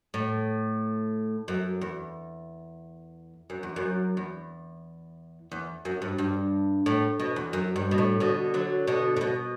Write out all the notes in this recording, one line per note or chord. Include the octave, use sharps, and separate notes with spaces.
A2
F#2
E2
F#2
E2
F#2
E2
E2
F#2
G2
G2
A2
B2
E2
F#2
G2
B2
A2
B2 D3
D3 F#3
B2 D3
A2
B2